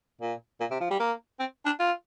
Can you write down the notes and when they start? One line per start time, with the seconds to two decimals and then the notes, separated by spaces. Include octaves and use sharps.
0.21 A#2
0.60 A#2
0.71 C3
0.80 F3
0.91 G3
1.00 A#3
1.39 C4
1.66 D4
1.79 F4